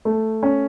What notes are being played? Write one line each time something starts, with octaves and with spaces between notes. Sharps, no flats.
A3
C#4